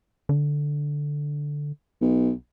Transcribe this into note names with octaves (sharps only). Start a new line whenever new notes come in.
D3
B1